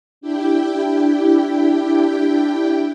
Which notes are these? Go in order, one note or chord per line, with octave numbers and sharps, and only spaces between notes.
D4 E4 G4 G5